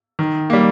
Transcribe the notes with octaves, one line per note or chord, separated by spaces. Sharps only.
D#3
G3 A#3